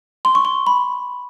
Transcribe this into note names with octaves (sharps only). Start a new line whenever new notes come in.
C6
C#6
C6
B5